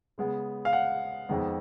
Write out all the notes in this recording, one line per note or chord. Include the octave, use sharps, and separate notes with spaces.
C#3 G#3 B3
F5
F#5
F2 D#3 G#3 B3